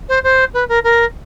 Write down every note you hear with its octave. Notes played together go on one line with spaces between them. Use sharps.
C5
C5
B4
A#4
A#4